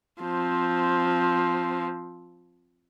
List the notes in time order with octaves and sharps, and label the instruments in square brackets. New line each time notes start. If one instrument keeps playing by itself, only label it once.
[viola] F3 C4